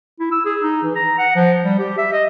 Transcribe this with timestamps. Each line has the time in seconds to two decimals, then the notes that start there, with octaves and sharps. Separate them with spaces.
0.20 E4
0.32 E6
0.45 G#4
0.62 D#4
0.83 E3
0.96 A#5
1.18 F#5
1.35 F3
1.64 G3
1.79 G4
1.98 E5
2.13 D#5